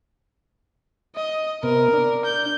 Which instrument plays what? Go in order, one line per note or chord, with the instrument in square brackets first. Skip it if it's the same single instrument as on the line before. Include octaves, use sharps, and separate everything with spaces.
[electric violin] D#5
[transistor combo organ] C3 B3 [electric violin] A#4
[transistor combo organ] D4
[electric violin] G6